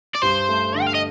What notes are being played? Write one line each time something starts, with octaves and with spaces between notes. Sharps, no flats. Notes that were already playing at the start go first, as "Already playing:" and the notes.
D5
G2 C5
A3
D3
G5
F5
D#5